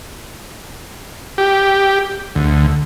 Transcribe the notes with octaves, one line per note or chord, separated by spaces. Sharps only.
G4
D2